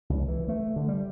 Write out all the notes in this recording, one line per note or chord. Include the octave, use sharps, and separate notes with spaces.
C#2
E3
A3
D3
G3